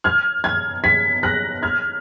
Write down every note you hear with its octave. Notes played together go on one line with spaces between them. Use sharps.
F6 G#6
F6 G#6
G#6 B6
F#6 A#6
F6 G#6